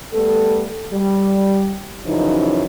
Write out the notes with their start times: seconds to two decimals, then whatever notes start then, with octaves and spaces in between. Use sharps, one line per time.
0.14 G3 A3 B3 A4
0.93 G3
2.06 F#2 C#3 E3 F3 D#4